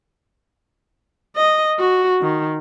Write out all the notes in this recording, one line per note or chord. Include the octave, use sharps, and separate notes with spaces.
D#5
F#4
D#3